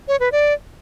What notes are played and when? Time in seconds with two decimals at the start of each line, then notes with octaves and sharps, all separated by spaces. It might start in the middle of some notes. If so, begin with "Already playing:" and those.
0.08 C#5
0.20 B4
0.32 D5